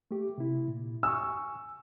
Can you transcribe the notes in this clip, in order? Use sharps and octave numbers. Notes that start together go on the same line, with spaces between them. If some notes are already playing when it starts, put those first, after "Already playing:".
A3 G4
C3 E4
A#2
G#5 C#6 E6